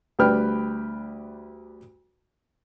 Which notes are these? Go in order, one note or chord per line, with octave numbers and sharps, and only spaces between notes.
D2 G3 D4 B4 G5 F6